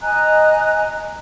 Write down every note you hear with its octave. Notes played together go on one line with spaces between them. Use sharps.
D#5 G#5 A#5 F#6